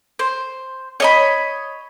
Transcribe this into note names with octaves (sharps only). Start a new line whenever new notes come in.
C5
C#5 D#5 B5